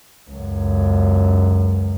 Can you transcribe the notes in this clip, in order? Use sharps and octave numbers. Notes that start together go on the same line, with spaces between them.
C#2 F#2